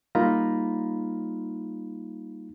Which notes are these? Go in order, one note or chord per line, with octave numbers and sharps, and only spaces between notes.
G3 A#3 D#4 F4 A#5 B5